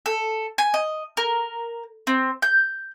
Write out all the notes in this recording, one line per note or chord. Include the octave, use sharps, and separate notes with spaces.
A4
G#5
D#5
A#4
C4
G6